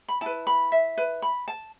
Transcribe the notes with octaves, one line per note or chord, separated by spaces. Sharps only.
B5
E4 B4 A5
B5
E5
B4
B5
A5